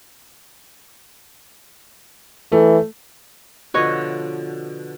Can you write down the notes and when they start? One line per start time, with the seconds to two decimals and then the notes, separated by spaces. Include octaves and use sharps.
2.52 E3 A3
3.74 B2 D3 F3 B4 C#5 D#5